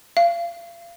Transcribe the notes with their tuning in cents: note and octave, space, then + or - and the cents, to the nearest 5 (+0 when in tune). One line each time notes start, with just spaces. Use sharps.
F5 -30